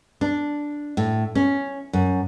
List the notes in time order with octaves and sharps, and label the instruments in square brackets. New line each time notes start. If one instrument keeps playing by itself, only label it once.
[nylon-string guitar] D4
A2
C#4
F#2